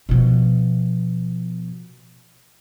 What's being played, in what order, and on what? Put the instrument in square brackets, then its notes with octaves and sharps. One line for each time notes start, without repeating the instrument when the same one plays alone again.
[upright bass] B2 F3